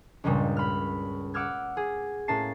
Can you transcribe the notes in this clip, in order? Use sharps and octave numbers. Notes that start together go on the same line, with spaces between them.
C#2 G2 A#2 C#3 G3
B5 F6
F#5 D6 E6 F6 G#6
G#4
A2 A#3 C#4 A5 C7